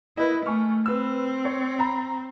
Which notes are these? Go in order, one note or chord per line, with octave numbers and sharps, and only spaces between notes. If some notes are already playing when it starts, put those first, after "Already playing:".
A#3 E4 B4 D#5
A3 G#5 C#6 F6
C4 B4 E6
C#5
A#5 B5